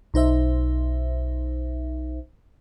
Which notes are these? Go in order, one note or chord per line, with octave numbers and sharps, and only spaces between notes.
B1 D#4 C5 E5